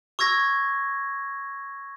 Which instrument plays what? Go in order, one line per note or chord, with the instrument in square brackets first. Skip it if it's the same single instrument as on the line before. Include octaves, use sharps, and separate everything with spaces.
[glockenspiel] C#6 E6 G#6 A#6